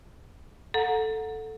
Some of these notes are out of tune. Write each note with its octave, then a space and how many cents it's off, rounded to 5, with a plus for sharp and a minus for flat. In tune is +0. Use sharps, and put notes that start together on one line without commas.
A4 +0 F#5 -20 A#5 +0